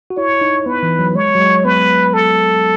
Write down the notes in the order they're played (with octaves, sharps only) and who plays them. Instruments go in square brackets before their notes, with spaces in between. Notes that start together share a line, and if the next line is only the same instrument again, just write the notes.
[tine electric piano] F#4
[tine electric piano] E4 [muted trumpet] C#5
[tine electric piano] D#4
[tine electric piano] B3 [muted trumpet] B4
[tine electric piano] E3
F#3
[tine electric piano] G#3 [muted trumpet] C#5
[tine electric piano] F#3
G#3
[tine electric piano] B3 [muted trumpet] B4
[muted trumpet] A4